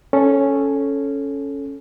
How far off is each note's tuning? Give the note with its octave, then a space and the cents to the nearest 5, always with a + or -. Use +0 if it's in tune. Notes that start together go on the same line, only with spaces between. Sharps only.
C#4 +0 A4 -10